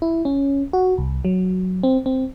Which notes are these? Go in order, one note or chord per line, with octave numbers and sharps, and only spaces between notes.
E4
C#4
F#4
C2
F#3
C4
C4